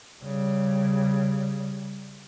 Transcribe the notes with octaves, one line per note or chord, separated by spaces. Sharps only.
C#3 G3